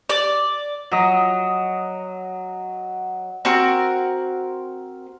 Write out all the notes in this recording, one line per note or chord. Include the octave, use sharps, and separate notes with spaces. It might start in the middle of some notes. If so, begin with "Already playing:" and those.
D5
F#3 D#5
C4 F#4 A#4